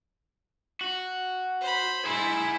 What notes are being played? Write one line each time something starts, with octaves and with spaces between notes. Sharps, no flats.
F#4
C5 B5
E4 G#4 C5